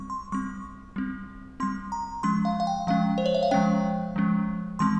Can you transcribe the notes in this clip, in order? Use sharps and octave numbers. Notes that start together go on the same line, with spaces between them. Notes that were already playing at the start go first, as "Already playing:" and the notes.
Already playing: G3 C4 C#6
C6
G3 C4 C#6
G3 C4
G3 C4 C6
A#5
F3 G#3 C#4 C6
F5
F5
G5
F3 G#3 C#4 F5
C5
C#5
E5
F5
F3 G#3 C#4 G5
F3 G#3 C#4
E3 G#3 C4 C6